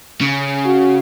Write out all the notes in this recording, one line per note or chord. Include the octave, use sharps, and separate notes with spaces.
C#3
F#4